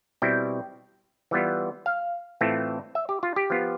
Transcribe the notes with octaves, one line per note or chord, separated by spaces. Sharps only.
B2 G3 C4 E4 G5
E3 G3 B3 F4
F5
A2 E3 A3 C4 F4
E5
G4
F4
G4
F3 B3 F4